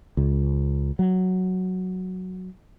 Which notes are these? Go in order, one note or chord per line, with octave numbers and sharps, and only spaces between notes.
C#2
F#3